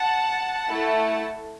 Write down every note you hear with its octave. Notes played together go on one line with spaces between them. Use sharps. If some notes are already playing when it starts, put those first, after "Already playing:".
Already playing: F#5 A5
A3 E4 A4